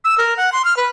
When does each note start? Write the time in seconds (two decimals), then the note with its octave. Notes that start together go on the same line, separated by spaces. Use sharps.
0.04 E6
0.18 A#4
0.37 F#5
0.52 C6
0.65 F6
0.77 B4